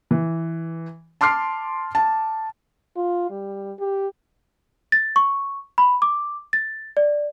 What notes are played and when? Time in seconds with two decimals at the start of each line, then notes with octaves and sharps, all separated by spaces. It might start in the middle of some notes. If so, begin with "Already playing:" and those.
0.11 E3
1.21 A5 C6 D6 F6 C7
1.95 A5
2.96 F4
3.30 G3
3.79 G4
4.92 A6
5.16 C#6
5.78 B5
6.02 D6
6.53 A6
6.97 D5